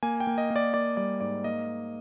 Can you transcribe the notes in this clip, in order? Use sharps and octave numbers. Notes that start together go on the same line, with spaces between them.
A#3 G#5
G5
A#3
D#5
A#3
D5
A#3 D5
G3 D5
G#2 D5
A#3 D#5